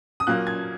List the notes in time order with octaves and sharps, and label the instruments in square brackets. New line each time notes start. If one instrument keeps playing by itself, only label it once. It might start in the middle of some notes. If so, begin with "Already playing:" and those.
[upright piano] D#6
A#2 F#3 A#3 F#6
G#6